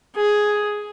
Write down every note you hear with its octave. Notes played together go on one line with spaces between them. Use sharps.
G#4